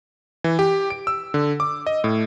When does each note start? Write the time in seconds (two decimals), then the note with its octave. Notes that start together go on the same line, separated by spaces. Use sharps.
0.44 E3
0.59 G4
0.90 D7
1.07 E6
1.34 D3
1.60 D6
1.86 D#5
2.04 A2